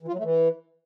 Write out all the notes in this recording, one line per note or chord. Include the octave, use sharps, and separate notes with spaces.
E3
F4
F#3
A3
E3